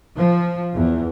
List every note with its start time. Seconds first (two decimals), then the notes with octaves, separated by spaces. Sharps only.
0.17 F3
0.76 E2